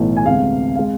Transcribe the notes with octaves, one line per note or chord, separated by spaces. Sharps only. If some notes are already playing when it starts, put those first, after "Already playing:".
Already playing: B1 A2 E3
G#5
D2 C3 G#3 B3 F5
C3 G#3 F5